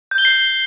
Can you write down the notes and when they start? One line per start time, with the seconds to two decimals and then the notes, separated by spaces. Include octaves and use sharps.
0.11 G6
0.18 G7
0.25 C7